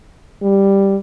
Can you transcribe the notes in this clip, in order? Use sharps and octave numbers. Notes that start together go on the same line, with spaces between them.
G3